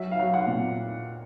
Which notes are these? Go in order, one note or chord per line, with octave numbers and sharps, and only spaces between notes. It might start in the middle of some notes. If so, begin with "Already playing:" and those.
Already playing: F#3 E5
F5
F#3
F#5
A#2